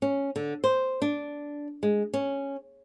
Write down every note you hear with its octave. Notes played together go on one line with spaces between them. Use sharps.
C#4
D3
C5
D4
G#3
C#4